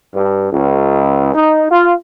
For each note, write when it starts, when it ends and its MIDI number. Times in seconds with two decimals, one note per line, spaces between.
0.15 0.51 43
0.52 1.32 37
1.35 1.67 63
1.71 1.93 65